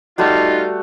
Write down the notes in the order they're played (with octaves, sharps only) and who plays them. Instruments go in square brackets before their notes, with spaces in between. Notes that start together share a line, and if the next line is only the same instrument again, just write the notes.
[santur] G3 A3 F#4 [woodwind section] D#4 F4